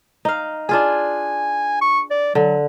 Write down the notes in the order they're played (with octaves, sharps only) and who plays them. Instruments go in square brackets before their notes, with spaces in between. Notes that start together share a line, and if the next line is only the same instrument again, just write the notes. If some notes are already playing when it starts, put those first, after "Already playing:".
[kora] D#4 F5
[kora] D4 F4 G#4 [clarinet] G#5
[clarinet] C#6
D5
[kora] D3 [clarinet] F#3